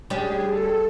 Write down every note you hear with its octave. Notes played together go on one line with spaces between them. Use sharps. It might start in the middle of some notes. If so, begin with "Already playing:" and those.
G3 C#4 D4 G#4
A4